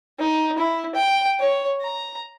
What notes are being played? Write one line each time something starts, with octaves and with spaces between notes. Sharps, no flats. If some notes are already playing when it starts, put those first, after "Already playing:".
D#4
E4
G5
C#5
A#5